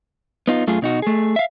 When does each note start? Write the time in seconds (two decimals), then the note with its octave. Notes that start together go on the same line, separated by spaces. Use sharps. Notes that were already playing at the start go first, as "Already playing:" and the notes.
0.48 B3 D#4 F4
0.67 F#2 A3 F4 G#4
0.82 B2 D#4 F#4
1.02 A3 G#4
1.36 E5 F5